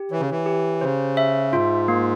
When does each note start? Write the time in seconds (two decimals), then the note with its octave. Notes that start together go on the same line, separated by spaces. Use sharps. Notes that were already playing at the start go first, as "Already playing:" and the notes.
Already playing: G4
0.11 E3 C#5
0.20 C#3
0.31 E3
0.46 G4
0.81 C#3 C5
1.17 E5
1.53 G#2 F4
1.88 A#3